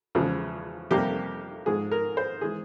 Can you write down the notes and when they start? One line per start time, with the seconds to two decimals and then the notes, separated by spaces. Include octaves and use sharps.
0.15 E2 C#3 F3 G#3
0.91 F2 C3 G3 A#3 G4
1.66 G#2 F3 G#3 G#4
1.91 A#4
2.17 C5
2.41 E3 G#3 G#4